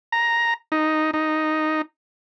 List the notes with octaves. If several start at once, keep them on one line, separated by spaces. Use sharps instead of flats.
A#5
D#4
D#4